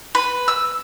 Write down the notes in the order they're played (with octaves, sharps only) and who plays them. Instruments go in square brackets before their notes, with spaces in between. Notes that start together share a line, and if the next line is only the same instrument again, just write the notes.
[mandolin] B4
E6